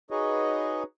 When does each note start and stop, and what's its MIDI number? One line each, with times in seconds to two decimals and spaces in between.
0.11 0.83 63
0.11 0.83 66
0.11 0.83 68
0.11 0.83 71
0.11 0.83 73
0.11 0.83 75